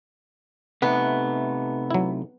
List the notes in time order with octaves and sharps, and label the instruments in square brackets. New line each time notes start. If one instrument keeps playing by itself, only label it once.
[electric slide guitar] C3 A3 D#4 [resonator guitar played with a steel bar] B3
[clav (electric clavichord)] F#3 E4